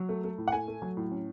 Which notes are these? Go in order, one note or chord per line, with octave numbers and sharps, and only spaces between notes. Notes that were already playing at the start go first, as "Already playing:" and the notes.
Already playing: F#3
A3
A3
A2
F#5
A3 G#5
A3
F#3
A2
C#4